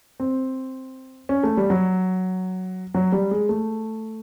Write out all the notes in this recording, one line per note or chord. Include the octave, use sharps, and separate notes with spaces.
C4
C#4
A3
G3
F#3
F#3
G3
G#3
A3